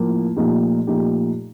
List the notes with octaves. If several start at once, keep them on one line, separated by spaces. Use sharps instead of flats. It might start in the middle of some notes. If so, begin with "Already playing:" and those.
Already playing: A2 F3 A#3
A#2 F3 A3 D#4 G4
A#2 F3 A3 D#4 G4